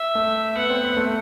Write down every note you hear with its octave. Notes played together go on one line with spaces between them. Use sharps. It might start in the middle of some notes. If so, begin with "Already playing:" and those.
Already playing: E5
A3
B3 F#5
C4
B3
A3